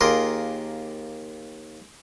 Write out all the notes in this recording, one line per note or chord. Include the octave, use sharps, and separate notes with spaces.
D#2 F4 G#4 A#4 C6 D6